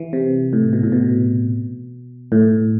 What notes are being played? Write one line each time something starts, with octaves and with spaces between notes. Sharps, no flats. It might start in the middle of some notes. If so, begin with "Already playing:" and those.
Already playing: E3
C3
A2
B2
A2
B2
A2